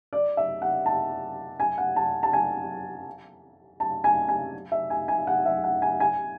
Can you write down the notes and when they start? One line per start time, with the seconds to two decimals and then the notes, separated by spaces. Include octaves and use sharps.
0.13 D5
0.37 E5
0.62 F#5
0.86 A5
1.60 G#5
1.78 F#5
1.96 A5
2.23 A5
2.33 G#5
3.80 A5
4.04 G#5
4.29 G#5
4.72 E5
4.90 G#5
5.08 G#5
5.27 F#5
5.46 E5
5.64 F#5
5.82 G#5
6.00 G#5